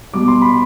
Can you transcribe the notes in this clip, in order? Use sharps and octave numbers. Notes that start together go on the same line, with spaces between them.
B2 G3 D6
C6
B5